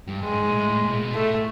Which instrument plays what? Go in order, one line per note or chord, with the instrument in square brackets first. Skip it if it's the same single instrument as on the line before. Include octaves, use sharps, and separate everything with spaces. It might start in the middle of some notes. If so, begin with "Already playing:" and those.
[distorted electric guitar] G2
[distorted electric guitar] G2 [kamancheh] G#3
[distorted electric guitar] G#2
G#2
A#2
A2
A2
A2
B2
A#2
B2
[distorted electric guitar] A2 [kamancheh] A3